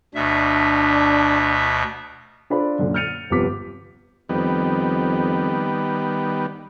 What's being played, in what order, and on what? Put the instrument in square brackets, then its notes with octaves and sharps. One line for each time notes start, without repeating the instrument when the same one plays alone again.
[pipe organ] D2 B2 E5 [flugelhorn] D4
[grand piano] D4 F4 A4 C5 D5 B5
F#2 A#2 D3
F6 G6 A6 C#7 D#7 F7
G1 C3 F3 B3 D6 B6
[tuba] F2 [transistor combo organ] D#3 G3 B3